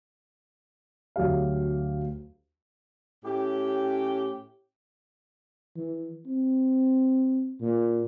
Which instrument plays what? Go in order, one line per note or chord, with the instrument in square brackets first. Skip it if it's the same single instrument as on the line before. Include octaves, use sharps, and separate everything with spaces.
[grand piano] D2 F#3 G4 F5
[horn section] A2 C#4 G4
[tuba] E3
C4
A#2